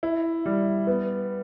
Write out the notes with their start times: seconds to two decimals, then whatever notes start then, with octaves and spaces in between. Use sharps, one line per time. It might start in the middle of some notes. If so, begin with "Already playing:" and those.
0.03 E4
0.46 G3
0.87 B3